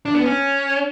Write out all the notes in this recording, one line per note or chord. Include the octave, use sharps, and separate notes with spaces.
D4
B3
C#4